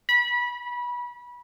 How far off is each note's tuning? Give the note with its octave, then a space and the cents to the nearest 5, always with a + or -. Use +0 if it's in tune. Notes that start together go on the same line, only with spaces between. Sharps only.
B5 -25